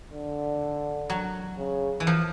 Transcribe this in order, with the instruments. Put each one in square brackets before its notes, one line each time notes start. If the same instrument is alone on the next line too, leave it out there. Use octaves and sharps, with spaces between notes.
[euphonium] D3
[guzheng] F#3
[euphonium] C#3
[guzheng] E3
F3